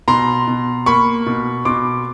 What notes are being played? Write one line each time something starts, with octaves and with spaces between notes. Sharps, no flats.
B2 A#5 C6
B2
A#3 B5 C#6
B2
B2 C6 D6